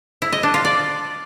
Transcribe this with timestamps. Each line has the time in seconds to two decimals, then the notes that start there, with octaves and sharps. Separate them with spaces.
0.22 E4
0.32 D#5
0.43 D4
0.54 F4
0.65 D5